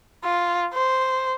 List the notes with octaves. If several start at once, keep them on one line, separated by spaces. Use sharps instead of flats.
F4
C5